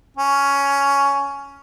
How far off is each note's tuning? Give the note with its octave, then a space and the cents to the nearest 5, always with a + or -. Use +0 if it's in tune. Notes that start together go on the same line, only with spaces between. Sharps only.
C#4 +10